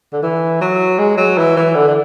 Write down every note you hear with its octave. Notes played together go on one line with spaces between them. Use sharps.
D3
E3
F#3
G#3
F#3
E3
E3
D3
D3